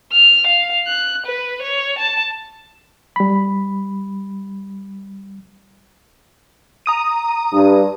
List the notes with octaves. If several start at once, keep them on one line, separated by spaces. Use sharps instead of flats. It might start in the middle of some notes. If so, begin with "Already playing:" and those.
F6
F5
F#6
B4
C#5
A5
G3 B5
A#5 D#6 D#7
G2